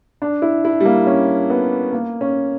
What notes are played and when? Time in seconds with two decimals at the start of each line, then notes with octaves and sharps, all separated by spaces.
0.22 D4
0.42 E4
0.65 E4
0.80 G3
0.85 A#3
1.07 C#4
1.50 B3
1.93 A#3
2.21 C#4